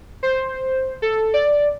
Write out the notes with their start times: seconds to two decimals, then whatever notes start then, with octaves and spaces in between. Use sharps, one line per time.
0.23 C5
1.02 A4
1.34 D5